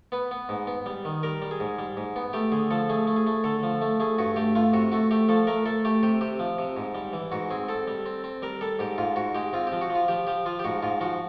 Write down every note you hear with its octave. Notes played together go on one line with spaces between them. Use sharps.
B3 B4
B3
G#2
B3
G3
D#3
G3 A#4
G3
G#4
G#2
G3
G#2
B3
A3 G4
D3 G#4
F3 A4
A3 G#4
A3
G#4
A3
D3 A4
F3
A3
A3 G#4
G2 F#4
A3 G4
A3 F4
C3 F#4
A3 F#4
A3 G4
F3 A4
A3 A#4
A3 A4
A3 G4
C3 G4
C3 G4
F3
C3
G#2
G3
E3
G#2 F#4
C4 G#4
C4 A4
G3
C4
C4
G3 A#4
G3 A4
G#2 G4
G#2 F4
G#2 F#4
G#3 G4
C4 F4
F3 G4
F#4
F3
F4
F3 G4
F3 G4
F3 F4
G4
G#2 F#4
G#2 F4
F3 F#4